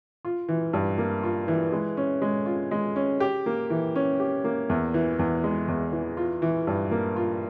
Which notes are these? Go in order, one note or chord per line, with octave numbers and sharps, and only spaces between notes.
F4
E3
G2
A#3
F4
E3
G#3
C#4
G#3
F4
G#3
C#4
G4
A#3
E3
C#4
G4
A#3
E2
E3
E2
G#3
E2
E3
F4
E3
G2
A#3
F4